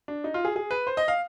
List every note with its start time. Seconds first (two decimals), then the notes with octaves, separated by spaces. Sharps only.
0.08 D4
0.24 D#4
0.34 F4
0.45 G#4
0.56 G#4
0.71 B4
0.87 C5
0.97 D#5
1.08 F5